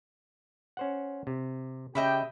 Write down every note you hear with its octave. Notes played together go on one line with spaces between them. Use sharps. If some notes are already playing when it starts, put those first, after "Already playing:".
C#4 C5 F#5
C3
C#3 G4 D#5 E5 G5 B5